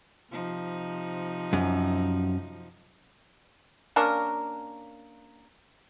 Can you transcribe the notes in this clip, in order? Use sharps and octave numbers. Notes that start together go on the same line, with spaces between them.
C3 F3 D#4
F#2
A#3 C#4 D4 A#4